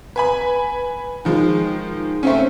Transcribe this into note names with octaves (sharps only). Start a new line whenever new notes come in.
B4 G#5 B5
D#3 F3 G#3
A3 C4 C#4